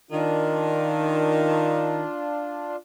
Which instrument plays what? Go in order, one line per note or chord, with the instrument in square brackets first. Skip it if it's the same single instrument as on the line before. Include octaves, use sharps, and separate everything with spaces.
[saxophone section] D#3 [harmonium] D4 F4